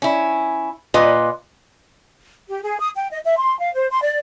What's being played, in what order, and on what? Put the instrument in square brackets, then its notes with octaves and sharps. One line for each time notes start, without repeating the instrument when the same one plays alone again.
[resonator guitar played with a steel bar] C#4 E4
A#2 F4 B4 D#5
[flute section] G4
G#4
D#6
G5
D#5
E5
C6
F5
C5
C6
D5